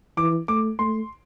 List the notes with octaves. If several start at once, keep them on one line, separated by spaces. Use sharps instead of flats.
E3 D6
A3 D6
A3 C6